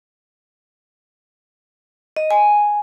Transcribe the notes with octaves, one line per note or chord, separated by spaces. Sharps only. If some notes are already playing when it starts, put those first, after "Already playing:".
D#5
G#5